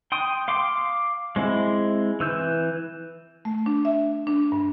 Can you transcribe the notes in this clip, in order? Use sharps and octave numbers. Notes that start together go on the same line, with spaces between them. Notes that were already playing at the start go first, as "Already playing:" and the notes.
G5 C6 D#6
F5 C6 D6
G#3 C4 E4
E3 E6 G6
A3
D4
E5
D4
G2